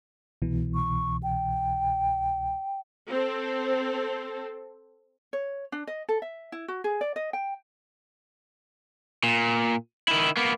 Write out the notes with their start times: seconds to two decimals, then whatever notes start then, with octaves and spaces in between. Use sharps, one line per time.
0.42 C2 B2 E3
0.75 C#6
1.23 G5
3.08 C4 A4
5.33 C#5
5.72 D4
5.87 D#5
6.09 A4
6.22 E5
6.52 E4
6.68 F#4
6.84 G#4
7.01 D5
7.16 D#5
7.33 G5
9.23 A#2
10.08 D#3 E4
10.37 A#3 B3